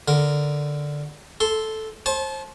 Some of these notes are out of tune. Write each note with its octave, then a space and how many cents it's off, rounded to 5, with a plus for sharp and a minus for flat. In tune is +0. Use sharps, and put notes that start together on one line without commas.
D3 +0 A#4 +0
A4 -5 C6 +0
C5 +35 A5 -30